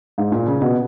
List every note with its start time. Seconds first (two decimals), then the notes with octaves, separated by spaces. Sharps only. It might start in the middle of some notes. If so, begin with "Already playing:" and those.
0.18 G#2
0.32 A#2
0.46 C#3
0.61 B2